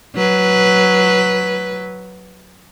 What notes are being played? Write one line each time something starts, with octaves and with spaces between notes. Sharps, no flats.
F#3 B4